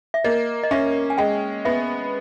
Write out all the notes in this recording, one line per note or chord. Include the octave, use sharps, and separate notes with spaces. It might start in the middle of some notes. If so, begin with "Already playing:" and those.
E5
A#3 D#5
D#5
C#4 E5
G#5
G#3 G5
B3 E5